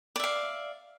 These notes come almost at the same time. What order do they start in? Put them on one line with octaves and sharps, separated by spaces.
D5 E5 F5